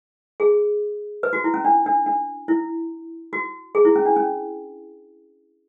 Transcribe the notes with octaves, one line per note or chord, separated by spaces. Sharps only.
G#4
B4
F#4
E4
C#4
D4
D4
D4
E4
F#4
G#4
E4
C#4
D4
C#4